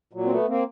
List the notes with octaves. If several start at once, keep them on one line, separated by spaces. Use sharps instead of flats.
A#2 F#3
C4
A3 B3
A#3 C4